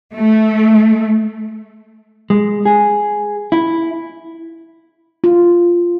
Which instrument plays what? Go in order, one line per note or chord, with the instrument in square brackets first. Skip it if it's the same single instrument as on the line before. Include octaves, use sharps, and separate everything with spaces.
[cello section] A3
[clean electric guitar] G#3
G#4
E4
[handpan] F4